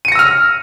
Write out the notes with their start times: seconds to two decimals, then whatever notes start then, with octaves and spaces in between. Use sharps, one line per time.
0.05 D#7
0.08 C#7
0.12 A#6
0.15 E6
0.19 F6